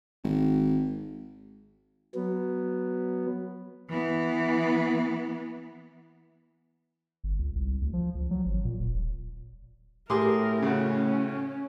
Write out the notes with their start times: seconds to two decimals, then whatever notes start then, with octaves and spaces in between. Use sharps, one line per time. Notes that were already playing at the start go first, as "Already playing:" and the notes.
0.24 G#1
2.15 F#3 B3
3.89 E3 B3
7.24 G1
7.39 C#2
7.55 C2
7.81 D2
7.93 F3
8.15 C#2
8.31 F#3
8.46 G#1
8.65 A#2
8.80 D#1
10.10 A2 G4 G#4 A#4 C6 D6 D#6
10.62 C#3 C#4 F#4